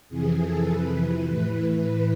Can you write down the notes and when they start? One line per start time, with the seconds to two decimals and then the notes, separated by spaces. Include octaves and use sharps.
0.09 F2 C3 E3 G#4
0.39 A4
0.69 F2 C3 E3 B4
1.28 A2 E3